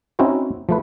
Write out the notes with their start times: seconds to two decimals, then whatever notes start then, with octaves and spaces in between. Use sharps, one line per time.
0.19 C4 C#4 D#4 E4 F#4 C5
0.69 F3 A3 B4